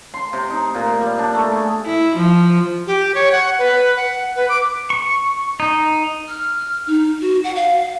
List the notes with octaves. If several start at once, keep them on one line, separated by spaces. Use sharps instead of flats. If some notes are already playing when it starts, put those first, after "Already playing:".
C6
C3
D#4
A#2
G3
D4
A3
G#4
E4
F3
G4
C#5
F#5
B4
F#5
B4
D6
C#6
D#4
F6
D#4
F#4
F#5
F5